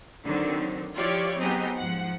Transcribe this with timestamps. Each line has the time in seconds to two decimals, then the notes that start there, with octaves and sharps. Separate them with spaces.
0.23 D3 D#3 F#3 C4
0.96 F3 E4 F4 G4 C#5 D5
1.40 F#3 B3 C4 D#4 G4 G#4
1.78 G#2 F3 F#5